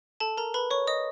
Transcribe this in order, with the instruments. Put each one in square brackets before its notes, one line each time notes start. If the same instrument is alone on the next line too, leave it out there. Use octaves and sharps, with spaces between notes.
[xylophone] A4 A5
A#4 A#5
B4 B5
C#5 C#6
D#5 D#6